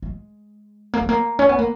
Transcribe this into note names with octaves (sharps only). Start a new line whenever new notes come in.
G#3
A#3
G#3
A#3
C#4
B3
A#3